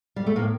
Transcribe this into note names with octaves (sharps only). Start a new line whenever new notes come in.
G3
A3
A2 A#3